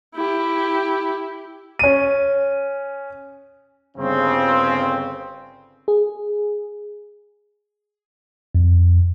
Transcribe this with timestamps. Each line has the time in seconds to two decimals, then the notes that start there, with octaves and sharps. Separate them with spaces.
0.15 E4 G4
1.79 C#4 D#7
3.97 G1 C#3 C4
5.88 G#4
8.55 F2